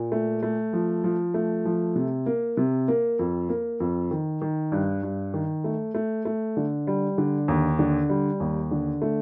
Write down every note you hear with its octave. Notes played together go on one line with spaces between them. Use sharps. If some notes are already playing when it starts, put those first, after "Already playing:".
Already playing: A#2
A3
A3
F3
F3
A3
F3
C3
A#3
C3
A#3
F2
A#3
F2
D#3
D#3
G2
G2
D#3
A3
A3
A3
D3
G3
D3
D#2
D3
G3
D#2
D3
A3